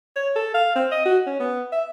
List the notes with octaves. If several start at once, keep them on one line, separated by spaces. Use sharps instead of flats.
C#5
A4
F5
C4
D#5
F#4
C#4
B3
E5